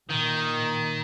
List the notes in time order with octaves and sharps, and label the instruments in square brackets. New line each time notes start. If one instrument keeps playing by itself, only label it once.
[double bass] A#2 [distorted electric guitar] D#3